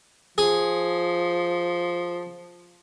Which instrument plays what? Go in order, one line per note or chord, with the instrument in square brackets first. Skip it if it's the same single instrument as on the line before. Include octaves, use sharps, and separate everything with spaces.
[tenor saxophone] F3 [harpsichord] G#4